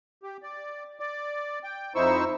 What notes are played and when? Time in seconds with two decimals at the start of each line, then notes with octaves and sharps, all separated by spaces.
0.23 G4
0.43 D5
1.00 D5
1.64 G5
1.95 F2 D#4 E4 C5 C#6 E6